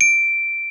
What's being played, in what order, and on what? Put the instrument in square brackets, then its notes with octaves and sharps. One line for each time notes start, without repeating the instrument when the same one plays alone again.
[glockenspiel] D7